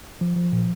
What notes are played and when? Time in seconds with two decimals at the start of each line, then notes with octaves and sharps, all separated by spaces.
0.21 F3
0.36 F3
0.52 A#2